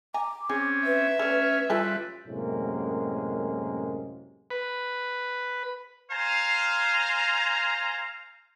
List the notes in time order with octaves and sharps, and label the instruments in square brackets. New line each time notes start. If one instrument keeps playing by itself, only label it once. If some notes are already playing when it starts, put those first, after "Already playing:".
[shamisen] G#5 A#5 [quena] D6
[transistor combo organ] C4 C#4 [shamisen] G#4
[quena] B4 [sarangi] E5
[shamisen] A3 D5 [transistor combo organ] C#4 F6
[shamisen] E3 C#4 A4 [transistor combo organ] G3 B4 [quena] F4
[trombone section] F#2 A2 C3 G#3 A#3 C#4
[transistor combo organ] B4
[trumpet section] C5 F5 G#5 A#5